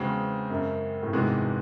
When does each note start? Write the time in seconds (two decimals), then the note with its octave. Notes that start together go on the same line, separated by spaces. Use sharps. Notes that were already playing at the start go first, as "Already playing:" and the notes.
Already playing: E2 C#3 G#3 C4 F#4
0.50 F#2
1.03 A2
1.13 E2 G#2 C3 E3 G#3 D#4 F#4